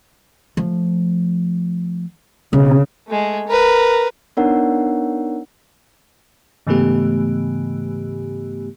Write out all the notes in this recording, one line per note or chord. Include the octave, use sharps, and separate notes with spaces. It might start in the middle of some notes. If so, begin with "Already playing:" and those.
F3 A3
B1 C#3
G#3 A3
A#4 B4
B3 D4 D#4 A#4 C#5 F#5
G#2 C#3 E3 A3 B3 G4